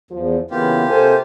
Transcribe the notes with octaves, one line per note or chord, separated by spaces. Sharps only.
E2 F3
C#3 E3 A#3 B3 E4 F4 G4
C3 A4 C5 G#5